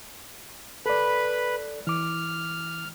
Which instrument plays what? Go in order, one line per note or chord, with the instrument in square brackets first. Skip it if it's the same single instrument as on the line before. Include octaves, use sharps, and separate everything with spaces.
[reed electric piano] A4 D5 [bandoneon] B4 B5
[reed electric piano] E3 D6 [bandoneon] F6